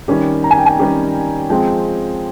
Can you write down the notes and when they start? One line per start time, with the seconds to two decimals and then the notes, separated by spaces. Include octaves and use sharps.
0.08 D#3 G3 C#4 G4
0.44 A#5
0.51 G#5
0.58 G5
0.66 G#5
0.79 D#3 G3 C#4 G4
1.49 F3 G#3 C4 G5